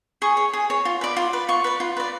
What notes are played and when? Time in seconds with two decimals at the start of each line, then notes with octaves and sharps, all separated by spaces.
0.22 G#4 C#6
0.37 C#5
0.53 G#4
0.70 C#5
0.85 F4
1.01 B4 D5
1.17 F4
1.33 B4 D5
1.49 F4 C#6
1.64 B4 D5
1.80 F4
1.97 B4 D5